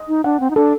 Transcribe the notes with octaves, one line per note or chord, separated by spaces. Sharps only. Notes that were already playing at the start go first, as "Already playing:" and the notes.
Already playing: D#5
D#4
D4 F#5
C4
D#4
D4 A4